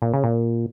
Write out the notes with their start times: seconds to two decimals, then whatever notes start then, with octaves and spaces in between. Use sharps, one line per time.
0.02 A#2
0.13 C#3
0.23 A#2